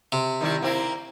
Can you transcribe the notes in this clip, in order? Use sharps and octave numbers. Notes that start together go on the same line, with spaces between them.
C3
D#3 G3 E4
A#3 C4 E4